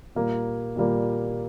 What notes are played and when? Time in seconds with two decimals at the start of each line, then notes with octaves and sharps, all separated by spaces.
0.15 A#2 G3 A#3
0.76 A#2 G3 A#3